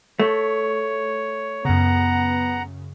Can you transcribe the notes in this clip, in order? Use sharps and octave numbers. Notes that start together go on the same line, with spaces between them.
A3 C#5
F#2 C#3 B3 F#5 A#5